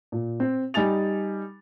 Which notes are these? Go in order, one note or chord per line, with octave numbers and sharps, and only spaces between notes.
A#2
C4
G3 D#4 G#5 A6 F7